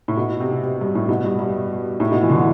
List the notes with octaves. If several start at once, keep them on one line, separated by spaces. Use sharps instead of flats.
A2
B2
C3
C3
G2
A2
B2
G2
G2
A2
B2
E3
D3
E3